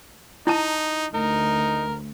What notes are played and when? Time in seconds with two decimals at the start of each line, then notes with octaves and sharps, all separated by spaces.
0.47 D#4 E4 A5
1.14 D2 D#4 A#4